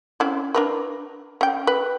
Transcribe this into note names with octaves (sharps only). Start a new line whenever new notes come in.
C4 C#4 E4
D4 A#4 B4
C#4 G5
B4